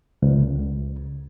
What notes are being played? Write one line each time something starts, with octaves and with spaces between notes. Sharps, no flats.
C#2